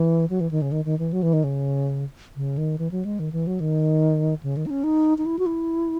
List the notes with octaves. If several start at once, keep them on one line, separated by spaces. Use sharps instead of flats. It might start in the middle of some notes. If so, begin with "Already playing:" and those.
Already playing: E3
F#3
E3
D#3
C#3
D#3
D#3
E3
F#3
E3
D#3
C#3
C#3
D#3
E3
F#3
G#3
D#3
E3
F#3
D#3
C#3
D#3
D#4
C#4
D#4
D#4
E4
F#4
E4